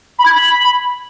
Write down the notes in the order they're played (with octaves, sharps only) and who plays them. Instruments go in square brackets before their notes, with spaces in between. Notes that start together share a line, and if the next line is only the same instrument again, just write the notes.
[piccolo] B5
G#6
B5